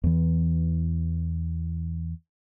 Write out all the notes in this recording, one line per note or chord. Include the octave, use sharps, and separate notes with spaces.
E2 E3